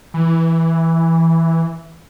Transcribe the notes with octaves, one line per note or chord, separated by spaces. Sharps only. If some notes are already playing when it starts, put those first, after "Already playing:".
E3